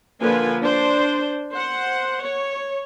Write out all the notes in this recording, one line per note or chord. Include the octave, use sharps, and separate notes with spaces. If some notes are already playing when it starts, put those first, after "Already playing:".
D3 F3 A#3 B4 G#5
D4 C5
C5 F#5
C#5